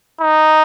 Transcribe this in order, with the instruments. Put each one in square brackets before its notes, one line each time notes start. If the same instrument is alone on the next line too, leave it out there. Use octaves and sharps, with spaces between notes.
[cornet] D#4